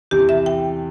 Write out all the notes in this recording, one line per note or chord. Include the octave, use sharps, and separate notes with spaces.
E2 C3 E3 G4
E5
G5